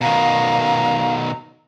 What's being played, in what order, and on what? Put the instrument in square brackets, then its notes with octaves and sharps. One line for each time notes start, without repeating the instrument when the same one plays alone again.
[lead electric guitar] B2 D#3 [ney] F5 [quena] A#5